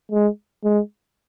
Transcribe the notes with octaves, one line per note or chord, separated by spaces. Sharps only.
G#3
G#3